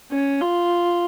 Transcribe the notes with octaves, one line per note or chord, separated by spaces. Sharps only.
C#4
F4